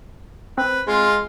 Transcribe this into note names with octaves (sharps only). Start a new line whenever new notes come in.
C4 B4
G#3 F4